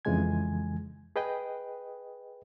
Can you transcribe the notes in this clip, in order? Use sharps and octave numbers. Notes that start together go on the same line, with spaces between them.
F2 C#3 E3 G#3 G#5 G#6
G#4 B4 D#5 G5